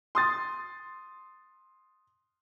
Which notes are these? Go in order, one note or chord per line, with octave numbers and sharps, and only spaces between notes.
C6 D#6 A6